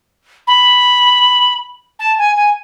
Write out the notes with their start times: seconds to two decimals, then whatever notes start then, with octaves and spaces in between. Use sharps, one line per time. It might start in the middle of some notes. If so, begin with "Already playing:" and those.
0.47 B5
1.99 A5
2.18 G#5
2.36 G#5